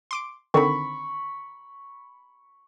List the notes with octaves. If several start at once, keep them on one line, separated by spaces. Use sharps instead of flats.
C6 D6 D7
D3 D#3 C4 B5 C#6